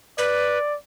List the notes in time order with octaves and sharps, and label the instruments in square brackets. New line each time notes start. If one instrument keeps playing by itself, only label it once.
[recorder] B4 [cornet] D5